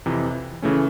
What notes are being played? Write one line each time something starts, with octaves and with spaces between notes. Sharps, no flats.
F2 C3 E3
C#3 E3 A3 C#4